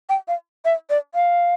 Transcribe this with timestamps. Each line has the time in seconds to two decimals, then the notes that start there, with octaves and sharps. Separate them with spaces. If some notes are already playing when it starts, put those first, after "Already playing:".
0.09 G5
0.28 F5
0.65 E5
0.90 D5
1.15 F5